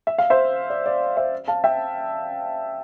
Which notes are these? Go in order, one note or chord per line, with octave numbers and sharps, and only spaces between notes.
E5
F5
C5 E5
D5
D5
C5 E5
F5 A5
E5 G5